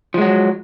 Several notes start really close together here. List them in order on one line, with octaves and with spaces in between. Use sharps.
F3 G#3 F#3